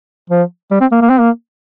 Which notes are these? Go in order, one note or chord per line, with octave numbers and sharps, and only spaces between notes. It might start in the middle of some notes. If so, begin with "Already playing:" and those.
F3
G3
C4
A#3
A#3
C4
A#3